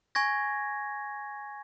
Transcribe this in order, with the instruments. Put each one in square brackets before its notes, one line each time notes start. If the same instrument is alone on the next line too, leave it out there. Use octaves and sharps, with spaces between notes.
[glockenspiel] G#5 C#6 G#6 A#6